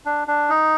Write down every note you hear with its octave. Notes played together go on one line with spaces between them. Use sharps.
D4
D4
D#4